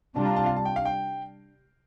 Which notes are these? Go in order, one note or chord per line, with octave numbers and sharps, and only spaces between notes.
C3 G3 D4 F4 A5
A#5
A5
F5
A5
G5
F5
G5